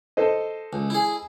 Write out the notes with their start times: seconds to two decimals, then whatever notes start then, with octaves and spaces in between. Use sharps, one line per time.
0.17 A4 C5 D#5
0.73 C#2
0.90 E4 G#4